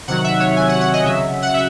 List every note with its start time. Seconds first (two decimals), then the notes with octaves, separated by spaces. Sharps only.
0.08 C3 D#3 F#3 F#5
0.24 E5
0.40 C#5
0.56 G#5
0.69 F#5
0.81 F#5
0.93 D#5
1.05 C#3 F#3 E5
1.42 F#5
1.54 E5